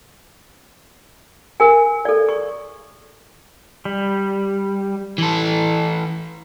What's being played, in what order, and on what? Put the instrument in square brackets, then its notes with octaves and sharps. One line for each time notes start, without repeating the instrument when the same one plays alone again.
[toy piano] A#4 G#5
A4 D5
C#6
[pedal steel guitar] G3
[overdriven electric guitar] E3 A4